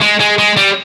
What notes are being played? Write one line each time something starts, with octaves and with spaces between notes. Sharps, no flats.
G#3
G#3
G#3
G3